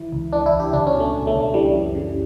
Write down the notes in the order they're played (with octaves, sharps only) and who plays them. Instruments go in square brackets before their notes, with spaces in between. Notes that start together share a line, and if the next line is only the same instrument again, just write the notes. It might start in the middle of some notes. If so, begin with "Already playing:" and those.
Already playing: [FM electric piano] E3 E4
C#2
E3 D4
E4
C#2
G4
C#2 D4
C#4
B2
A3
B2
A3
C#2
A3
E3 G3
F#2
C#3